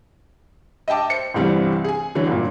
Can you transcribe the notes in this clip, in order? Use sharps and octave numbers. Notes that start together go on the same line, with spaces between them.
D#5 E5 G5 A5 D6
C5 C#7
G1 C2 G2 E3 G3 C4
G#4 G#5
D3 E3 F#3 C#4
G1 F2 A#2